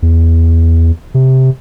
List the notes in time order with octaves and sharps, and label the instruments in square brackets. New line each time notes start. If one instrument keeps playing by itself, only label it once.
[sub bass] E2
C3